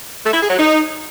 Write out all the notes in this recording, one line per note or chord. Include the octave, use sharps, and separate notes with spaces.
A3
E4
G#4
F#3
D#4